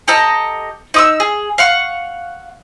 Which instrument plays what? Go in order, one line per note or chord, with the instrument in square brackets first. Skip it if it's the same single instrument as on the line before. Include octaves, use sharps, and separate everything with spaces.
[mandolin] G4 A4 D#5 A#5
D#4 D#6 E6
G#4
F5 F#5 C#6